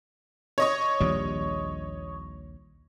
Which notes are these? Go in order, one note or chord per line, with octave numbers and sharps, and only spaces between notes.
C#5 D#5 C#6
A#1 D#2 G3